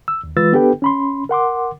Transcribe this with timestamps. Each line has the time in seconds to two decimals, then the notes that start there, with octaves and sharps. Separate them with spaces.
0.08 E6
0.24 D#2
0.37 E3 G#3 F4 B4 E6 A6
0.53 B3 D4 G4 A4 B4 G5
0.82 C#4 B5 C6
1.29 A#4 F#5 C6 D6